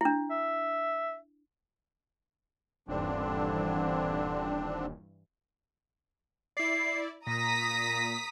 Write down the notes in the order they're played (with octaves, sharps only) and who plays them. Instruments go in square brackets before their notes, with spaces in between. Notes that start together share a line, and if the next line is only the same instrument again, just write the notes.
[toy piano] D4 E4
[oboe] E5
[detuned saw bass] D#1 [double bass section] G2 E3 [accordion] D3 C4 D4
[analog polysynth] E4 D5 [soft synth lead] C7
[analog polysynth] A#2 [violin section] A#5 D#6 B6 [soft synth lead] A#6